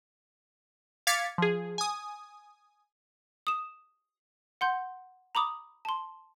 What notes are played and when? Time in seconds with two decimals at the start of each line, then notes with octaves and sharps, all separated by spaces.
1.07 F5 D6 G#6 A6 B6 C#7
1.38 F3 G#4
1.78 G#5 D#6
3.47 D#6 E7
4.61 F#5 C6 G6
5.35 A#5 B5 D6 D#6
5.85 A5 C6